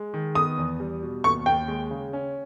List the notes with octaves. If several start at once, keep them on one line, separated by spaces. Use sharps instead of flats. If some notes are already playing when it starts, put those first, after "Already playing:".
Already playing: G#3
D#3
B3 D#6
E2
G3
B2
D#2 C#6
D#2 G5
G#3
C#3
C#4